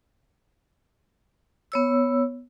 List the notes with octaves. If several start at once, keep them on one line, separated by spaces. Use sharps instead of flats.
B3 C#5 E6